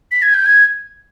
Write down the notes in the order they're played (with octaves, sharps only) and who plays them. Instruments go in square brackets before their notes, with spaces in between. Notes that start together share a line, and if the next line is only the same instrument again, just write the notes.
[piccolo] B6
G#6
G6
G#6